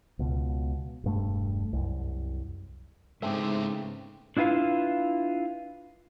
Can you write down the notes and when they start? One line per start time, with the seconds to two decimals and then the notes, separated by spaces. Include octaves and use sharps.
0.19 C#2 B2
1.04 E1 G2 A3
1.73 C2 F#2
3.22 G#2 C#3 G#3 A3 B3 C4 G4 E5
4.37 D4 E4 F4 B4 F5